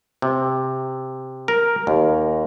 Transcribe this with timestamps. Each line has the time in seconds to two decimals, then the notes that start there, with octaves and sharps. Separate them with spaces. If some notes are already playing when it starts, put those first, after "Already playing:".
0.22 C3
1.48 A#4
1.87 D#2